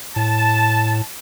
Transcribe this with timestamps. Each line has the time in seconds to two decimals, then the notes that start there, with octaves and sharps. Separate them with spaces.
0.16 A2 A5